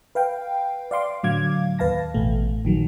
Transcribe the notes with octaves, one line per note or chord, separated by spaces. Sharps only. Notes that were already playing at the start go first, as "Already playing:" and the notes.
B4 F5 G5
D5 F5 C6 D6
A2 D3 F#3 F5 D6 G#6
D#2 B4 F5 A5 A#6
A1 B2 A3
A#1 D#3 F#3